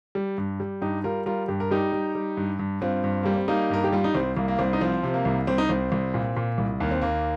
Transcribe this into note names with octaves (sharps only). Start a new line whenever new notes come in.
G3
G2
G3
G2 D#4 G4
G3 F4 A#4
G3 F4 A#4
G2 G4
A#4
G3 D#4 G4
G3
G3
G2
G2
G2 C4 F4
G2
G3 A#3
C4
G3 A#3 D#4
G2 A#4
G4
G3 F4
D#4
C2 C4
C2 A#3
A#3
C2 C4
D#4
F3 C4
C3
A#3
C2
C2 C4
D#4
C2 C4
C2
A#2
A#2
C2
D#2 A#3
C4
D#2 A#3